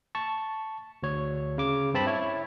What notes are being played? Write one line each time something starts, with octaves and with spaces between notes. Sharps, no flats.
A5 C#6
D2 C#5
C#3 D6
G2 C4 A5 B5
E4 C#5